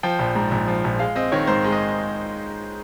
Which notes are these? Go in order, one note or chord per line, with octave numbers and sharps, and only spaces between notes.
F3 G5
A#1
G#2
A#1
F3
A#1
G#3 F5
C4 D#5
D#3 C#5
G#2 C5
G#3
D#5